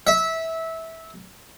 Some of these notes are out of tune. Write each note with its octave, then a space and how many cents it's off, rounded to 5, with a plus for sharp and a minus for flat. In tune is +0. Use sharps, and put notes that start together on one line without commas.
E5 -20